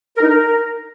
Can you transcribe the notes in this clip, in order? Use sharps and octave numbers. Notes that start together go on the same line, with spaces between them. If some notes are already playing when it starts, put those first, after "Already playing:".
A#4
D#4
A#4